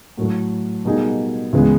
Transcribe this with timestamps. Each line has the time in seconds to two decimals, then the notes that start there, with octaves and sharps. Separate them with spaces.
0.17 A2 F#3 A3
0.85 B2 G3 A#3 D#4 G#4
1.53 C#2 C#3 E3 G#3 B3